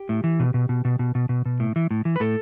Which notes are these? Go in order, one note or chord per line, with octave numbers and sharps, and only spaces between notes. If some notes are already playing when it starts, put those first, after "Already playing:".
Already playing: G4
A2
E3
B2
B2
B2
B2
B2
B2
B2
B2
A2
E3
A2
E3
B4
A2 A4